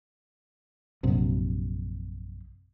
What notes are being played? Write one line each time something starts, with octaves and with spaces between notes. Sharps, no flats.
A#1 F#2 C3